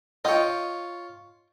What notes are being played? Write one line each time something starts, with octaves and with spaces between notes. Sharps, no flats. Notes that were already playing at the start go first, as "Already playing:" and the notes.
F4 C#5 D#5 G5